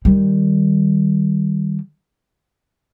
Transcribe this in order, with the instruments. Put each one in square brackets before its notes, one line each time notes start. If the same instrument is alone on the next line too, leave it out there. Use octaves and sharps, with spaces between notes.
[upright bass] D#3 G3